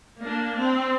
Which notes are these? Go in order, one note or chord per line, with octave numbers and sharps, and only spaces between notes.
A#3 D4
C4